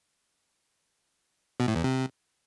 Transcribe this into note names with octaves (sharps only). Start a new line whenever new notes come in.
B2
A2
E2
C3